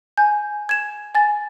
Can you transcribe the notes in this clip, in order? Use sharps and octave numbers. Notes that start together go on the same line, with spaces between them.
G#5 G6
G#6 E7
G#5 A6